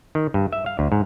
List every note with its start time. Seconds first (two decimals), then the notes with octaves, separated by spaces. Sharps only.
0.15 D#3
0.34 G2
0.52 E5
0.66 F5
0.79 D2
0.92 G#2